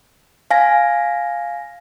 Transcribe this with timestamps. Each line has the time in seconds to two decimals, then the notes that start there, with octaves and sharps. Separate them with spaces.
0.51 F5 G#5 A#6